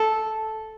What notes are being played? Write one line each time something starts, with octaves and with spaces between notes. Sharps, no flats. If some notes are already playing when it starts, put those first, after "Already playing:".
Already playing: A4